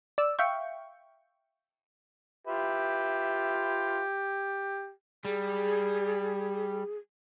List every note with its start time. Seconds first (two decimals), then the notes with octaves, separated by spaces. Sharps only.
0.18 D5 E6
0.39 E5 F5 G5 C#6
2.47 F4 G4 B4 E5
5.25 G3 G#4